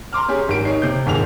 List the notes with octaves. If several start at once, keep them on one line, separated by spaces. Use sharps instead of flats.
A#5 C6 D6 F6
C#4 G4 G#4
G#1 G4 D7
D#4 C#5 C7
C3 G6
G#1 D#2 A#2 G#4 F7